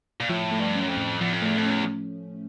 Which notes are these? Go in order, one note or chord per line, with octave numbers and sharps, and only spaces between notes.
A#2
A2 F3
A3
G2
C#4
F#2
F2
A2
E2 F3
F2
E2 A3
F2
E2 C#4